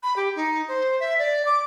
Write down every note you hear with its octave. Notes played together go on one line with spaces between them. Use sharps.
B5
G4
D#4
C5
E5
D5
D6